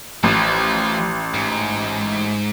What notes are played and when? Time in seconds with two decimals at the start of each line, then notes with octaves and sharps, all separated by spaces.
0.24 A1 F3
1.34 G#2